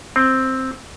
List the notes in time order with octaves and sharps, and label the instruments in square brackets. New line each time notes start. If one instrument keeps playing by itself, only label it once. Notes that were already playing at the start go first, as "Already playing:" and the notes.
[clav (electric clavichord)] C4